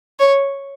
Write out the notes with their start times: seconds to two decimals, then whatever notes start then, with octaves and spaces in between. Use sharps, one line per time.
0.19 C#5